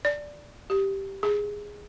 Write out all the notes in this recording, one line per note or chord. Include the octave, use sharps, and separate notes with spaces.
D5
G4
G#4